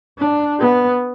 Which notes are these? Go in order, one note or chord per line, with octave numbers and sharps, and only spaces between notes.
D4
B3